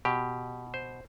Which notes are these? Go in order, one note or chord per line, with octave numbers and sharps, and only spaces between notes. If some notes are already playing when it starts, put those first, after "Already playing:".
B2 G4
C5